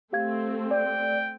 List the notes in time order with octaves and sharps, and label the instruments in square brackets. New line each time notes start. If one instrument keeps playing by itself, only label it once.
[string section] A3 C4 [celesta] G4 F5 G#6
[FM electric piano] D5 [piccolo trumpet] G5